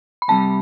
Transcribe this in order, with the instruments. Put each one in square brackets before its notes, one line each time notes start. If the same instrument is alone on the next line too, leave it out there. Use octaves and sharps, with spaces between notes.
[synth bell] B5
[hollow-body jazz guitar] C2 C3 G3 [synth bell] A5